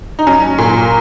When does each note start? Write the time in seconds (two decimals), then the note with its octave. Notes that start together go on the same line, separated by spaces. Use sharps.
0.19 D#4
0.27 F#3 C#4
0.58 A#2